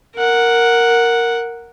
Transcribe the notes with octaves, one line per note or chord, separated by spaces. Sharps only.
A#4 F#5